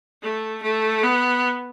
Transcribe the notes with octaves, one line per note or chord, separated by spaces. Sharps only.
A3
A3
B3